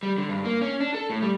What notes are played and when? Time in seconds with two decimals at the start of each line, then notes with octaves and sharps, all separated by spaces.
0.03 G3
0.18 D3
0.29 G2
0.45 A#3
0.62 C#4
0.80 D4
0.94 A4
1.10 A2
1.22 G3